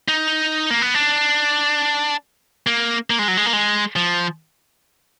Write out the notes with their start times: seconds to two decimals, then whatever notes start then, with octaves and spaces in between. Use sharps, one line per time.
0.08 D#4
0.70 A#3
0.82 B3
0.95 D4
2.67 A#3
3.10 A#3
3.19 G#3
3.28 F#3
3.37 G#3
3.46 A#3
3.53 G#3
3.96 F3